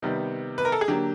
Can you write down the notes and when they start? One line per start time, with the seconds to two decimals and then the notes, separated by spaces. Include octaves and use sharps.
0.02 C3 D#3 G3 B3
0.58 B4
0.65 A#4
0.72 A4
0.81 G#4
0.88 D3 F#3 A#3 G4